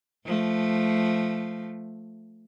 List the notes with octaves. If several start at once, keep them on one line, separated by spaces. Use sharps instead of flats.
F3 A3